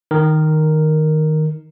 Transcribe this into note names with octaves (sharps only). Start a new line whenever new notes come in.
D#3 A#4